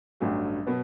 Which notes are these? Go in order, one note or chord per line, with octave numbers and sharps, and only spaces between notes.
A1 G2 D3 F#3 A3
B2 F#3 B3